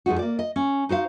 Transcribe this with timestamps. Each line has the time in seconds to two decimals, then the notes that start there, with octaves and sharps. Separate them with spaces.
0.06 F2 G#3 D#4 F#4
0.19 A#3 D5
0.39 D#5
0.56 C#4
0.89 D#4 F#4 C5 F5